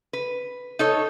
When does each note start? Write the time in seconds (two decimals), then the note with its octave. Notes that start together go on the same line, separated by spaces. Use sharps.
0.13 B4
0.79 D#4 A4 C#5